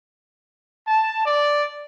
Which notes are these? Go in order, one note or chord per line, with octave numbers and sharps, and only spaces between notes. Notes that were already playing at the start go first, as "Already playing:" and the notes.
A5
D5